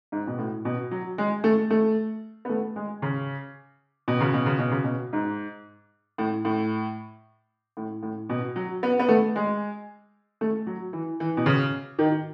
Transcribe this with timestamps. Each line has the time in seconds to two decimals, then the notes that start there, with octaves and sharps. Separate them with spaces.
0.12 G#2
0.27 B2
0.39 A2
0.65 B2
0.91 F#3
1.18 G#3
1.44 A3
1.70 A3
2.45 B3
2.49 A3
2.76 G#3
3.02 C#3
4.08 B2
4.21 C#3
4.34 B2
4.46 C#3
4.59 B2
4.71 C#3
4.84 B2
5.13 G#2
6.18 A2
6.45 A2
7.77 A2
8.03 A2
8.29 B2
8.56 F#3
8.83 B3
8.99 B3
9.08 A3
9.36 G#3
10.41 A3
10.67 F#3
10.93 E3
11.20 E3
11.37 B2
11.46 C#3
11.99 D#3